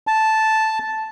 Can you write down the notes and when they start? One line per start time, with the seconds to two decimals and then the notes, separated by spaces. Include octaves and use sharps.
0.07 A5